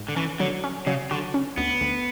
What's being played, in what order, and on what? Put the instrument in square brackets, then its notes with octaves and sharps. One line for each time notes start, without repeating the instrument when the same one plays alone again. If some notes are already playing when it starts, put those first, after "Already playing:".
Already playing: [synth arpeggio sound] G#2
[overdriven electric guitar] D3
[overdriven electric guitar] E3 [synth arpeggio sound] C#4
[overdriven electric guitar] D3 [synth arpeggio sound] F#3
[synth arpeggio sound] C#4
[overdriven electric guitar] C#3 [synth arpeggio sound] F#3
[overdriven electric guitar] D3 [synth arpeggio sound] F#4
[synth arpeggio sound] C#4
[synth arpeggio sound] D2 [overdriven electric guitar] B3
[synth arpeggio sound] D2